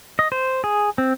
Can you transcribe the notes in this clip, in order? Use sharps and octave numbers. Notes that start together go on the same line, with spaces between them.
D#5
C5
G#4
C4